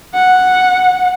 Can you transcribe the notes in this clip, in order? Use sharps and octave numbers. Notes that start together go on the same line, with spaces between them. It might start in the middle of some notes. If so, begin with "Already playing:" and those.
F#5